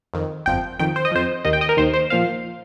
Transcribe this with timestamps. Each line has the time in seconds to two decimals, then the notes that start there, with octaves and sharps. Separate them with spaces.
0.14 F2 D#3
0.46 G1 F2 F3 G5
0.79 F2 D#3 G5
0.96 C5
1.05 D#5
1.12 F2 F3 C5
1.45 D#2 D#3 D#5
1.53 G5
1.61 D#5
1.69 A#4
1.77 D#2 D#3 C5
1.93 C5
2.10 A#2 F3 F5